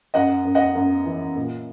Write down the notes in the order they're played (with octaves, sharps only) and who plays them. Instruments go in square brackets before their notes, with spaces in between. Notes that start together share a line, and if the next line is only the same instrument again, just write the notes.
[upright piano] F#2 D#5 F#5
F#2
D#5 F#5
F#2
E3
A#2